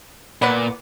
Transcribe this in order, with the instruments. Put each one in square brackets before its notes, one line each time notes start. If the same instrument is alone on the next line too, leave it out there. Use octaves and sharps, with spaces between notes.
[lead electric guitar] A#2 [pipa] B3 D5 F#5